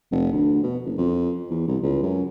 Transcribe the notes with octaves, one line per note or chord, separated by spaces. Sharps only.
F1
D2
B2
F#1
F2
E2
C2
C#2
F#2